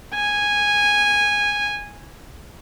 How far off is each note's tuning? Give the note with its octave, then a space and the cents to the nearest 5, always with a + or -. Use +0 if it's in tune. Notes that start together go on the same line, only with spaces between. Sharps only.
G#5 -10